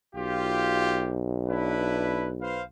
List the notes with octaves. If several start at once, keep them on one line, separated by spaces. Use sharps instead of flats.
B1 F4 G4
D4 E4 B4
B4 C5 F5